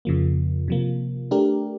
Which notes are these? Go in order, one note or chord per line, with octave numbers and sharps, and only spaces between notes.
F2 C#3 F3 A#3
C3 F3 A#3
A3 D4 G4 A#4